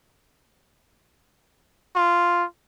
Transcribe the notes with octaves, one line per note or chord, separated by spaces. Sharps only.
F4